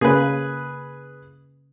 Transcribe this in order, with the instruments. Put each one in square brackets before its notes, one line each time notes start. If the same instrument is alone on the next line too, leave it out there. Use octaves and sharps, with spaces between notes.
[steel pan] C#3 A#3 [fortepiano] G#4 B4